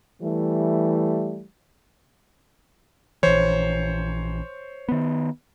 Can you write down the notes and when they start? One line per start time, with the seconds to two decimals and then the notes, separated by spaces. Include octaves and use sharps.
0.21 E3 G3 A3
3.23 A#1 E3 C5 C#5
4.88 D#3 B3